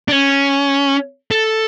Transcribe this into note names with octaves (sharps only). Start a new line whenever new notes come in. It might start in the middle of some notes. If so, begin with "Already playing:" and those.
D4
C#4
A4